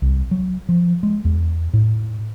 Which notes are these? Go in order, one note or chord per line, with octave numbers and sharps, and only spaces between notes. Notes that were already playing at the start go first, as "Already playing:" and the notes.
C2
F#3
F3
G#3
E2
A2